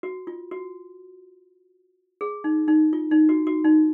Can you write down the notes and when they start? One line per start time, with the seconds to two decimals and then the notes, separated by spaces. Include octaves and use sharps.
0.03 F#4
0.27 F4
0.51 F#4
2.21 G#4
2.44 D#4
2.68 D#4
2.93 F4
3.11 D#4
3.29 F#4
3.47 F#4
3.65 D#4